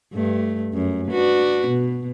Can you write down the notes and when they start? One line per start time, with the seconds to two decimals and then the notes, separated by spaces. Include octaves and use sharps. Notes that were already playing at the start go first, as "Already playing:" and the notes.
0.13 G2 A3
0.73 F#2
1.09 D4 F#4 B4
1.67 B2